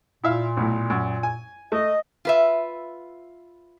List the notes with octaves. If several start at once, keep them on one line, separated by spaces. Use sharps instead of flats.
A#2 E4 E5 F5
B1 A2
F#2
G#5
A3 D#5
F4 B4 E5